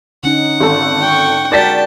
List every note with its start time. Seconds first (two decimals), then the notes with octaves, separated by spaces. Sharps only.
0.23 D3 C#4 D#4 F#5
0.60 G#1 A4
1.01 G5 C#6
1.52 G#3 F#4 A#4 D5 G5 A5 A6 B6